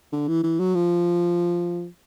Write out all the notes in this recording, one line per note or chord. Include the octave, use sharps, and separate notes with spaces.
D3
E3
E3
F#3
F3